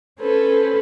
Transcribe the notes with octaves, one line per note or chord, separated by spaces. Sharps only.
C#4 A4 B4 C5